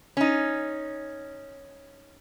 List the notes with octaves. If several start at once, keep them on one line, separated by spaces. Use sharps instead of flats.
C#4 D#4